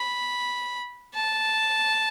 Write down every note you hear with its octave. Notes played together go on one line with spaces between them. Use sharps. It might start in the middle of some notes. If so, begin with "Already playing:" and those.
Already playing: B5
A5